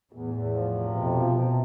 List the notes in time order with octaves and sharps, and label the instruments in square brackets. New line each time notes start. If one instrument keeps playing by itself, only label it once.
[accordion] E2 [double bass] A2
[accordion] E2
F3
C3
[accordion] F2 [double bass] B2
[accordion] F3
C3